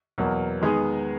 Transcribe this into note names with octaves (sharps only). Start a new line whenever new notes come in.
E2 B2 F#3 A#3
D#3 G#3 B3 D#4 G#4